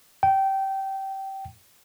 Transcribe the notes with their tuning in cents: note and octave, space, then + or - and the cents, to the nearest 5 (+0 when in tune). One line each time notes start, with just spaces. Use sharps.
G5 -20